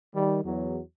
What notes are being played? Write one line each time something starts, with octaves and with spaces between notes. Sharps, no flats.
D#3 G3
E2 F#3